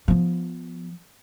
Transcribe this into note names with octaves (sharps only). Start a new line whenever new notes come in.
F3 B3